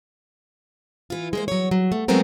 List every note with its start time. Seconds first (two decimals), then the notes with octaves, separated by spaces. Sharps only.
1.10 E3 F4
1.33 G#3 A#3 C5
1.48 F#3 C#5
1.71 F#3
1.92 A3
2.08 F#3 G#3 A3 B3 C4 A#4